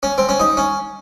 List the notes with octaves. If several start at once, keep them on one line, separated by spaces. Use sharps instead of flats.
C#4
C4
C#4
D#4
C#4